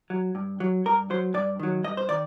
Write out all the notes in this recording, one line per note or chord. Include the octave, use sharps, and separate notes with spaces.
F#3
G2
F#3
G2 A#4
F#3 C5
G2 D5
D#3 F#3
G2 D#5
C5
D#3 D5